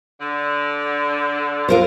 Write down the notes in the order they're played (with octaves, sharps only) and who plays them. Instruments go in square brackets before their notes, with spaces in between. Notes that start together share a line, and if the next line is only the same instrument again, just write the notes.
[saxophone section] D3
[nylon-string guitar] F4 A#4 C5